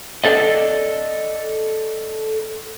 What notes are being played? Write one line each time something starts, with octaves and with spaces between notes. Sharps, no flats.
A4 D5 D#5